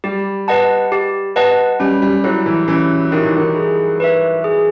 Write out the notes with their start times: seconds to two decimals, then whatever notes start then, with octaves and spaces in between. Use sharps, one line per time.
0.04 G3 G4
0.48 B4 D#5 F#5 A5
0.92 G4
1.36 B4 D#5 F#5 A5
1.80 G3 C#4
2.02 G3
2.24 F#3 E4 G4
2.46 E3
2.68 E3 C#4
3.12 D#3 E4 G4
3.24 E3
3.37 D#3
3.56 G#4
4.00 B4 E5
4.44 G#4